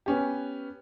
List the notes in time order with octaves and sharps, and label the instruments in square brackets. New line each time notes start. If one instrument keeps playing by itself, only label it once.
[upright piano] B3 C#4 G4